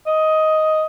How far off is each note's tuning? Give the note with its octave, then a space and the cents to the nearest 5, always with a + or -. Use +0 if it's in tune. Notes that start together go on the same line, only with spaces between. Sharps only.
D#5 +10